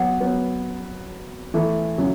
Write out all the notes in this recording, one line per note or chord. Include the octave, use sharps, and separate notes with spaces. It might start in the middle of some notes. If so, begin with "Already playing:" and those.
Already playing: F#3 B3 F#5
F#3 B3
E3 A3
C#3 F#3